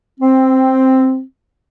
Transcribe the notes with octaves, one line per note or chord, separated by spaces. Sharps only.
C4